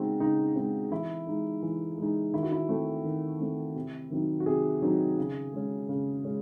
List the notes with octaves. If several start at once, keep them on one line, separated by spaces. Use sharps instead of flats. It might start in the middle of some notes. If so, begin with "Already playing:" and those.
Already playing: C#3 G#3 C4 D#4 F#4
C#3 D#4
G#3 C4 D#4
E3 E4
G#3 D#4
E3
G#3 D#4
D#3 E4
F#4
E4
A3 C4
D#3
A3 C4
C3
D#3 F#3 C4 D#4
F#4
C3 G#4
D#3 F#3 C4 D#4
C#3
G#3 C#4
C#3
G#3 C#4